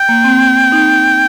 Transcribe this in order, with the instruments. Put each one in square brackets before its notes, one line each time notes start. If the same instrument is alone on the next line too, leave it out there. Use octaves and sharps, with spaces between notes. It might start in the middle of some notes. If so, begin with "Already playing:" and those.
Already playing: [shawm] G5
[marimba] A#3
C4
D#4